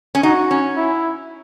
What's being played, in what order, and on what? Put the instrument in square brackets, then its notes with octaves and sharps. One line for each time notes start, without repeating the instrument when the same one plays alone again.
[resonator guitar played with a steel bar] C#4
[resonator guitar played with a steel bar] D#4 [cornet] F#4
[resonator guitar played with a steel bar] C#4
[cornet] E4